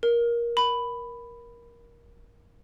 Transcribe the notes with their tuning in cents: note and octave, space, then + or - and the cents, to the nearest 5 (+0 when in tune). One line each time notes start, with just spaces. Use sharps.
A#4 +15
B5 +5